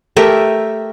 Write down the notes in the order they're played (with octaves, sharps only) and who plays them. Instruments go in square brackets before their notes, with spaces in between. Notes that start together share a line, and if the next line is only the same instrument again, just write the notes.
[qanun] A3 G4 A#4 E5